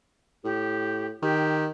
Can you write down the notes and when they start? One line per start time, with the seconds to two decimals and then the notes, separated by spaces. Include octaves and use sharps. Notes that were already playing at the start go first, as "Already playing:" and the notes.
0.44 A2 G4
1.22 D#3 G4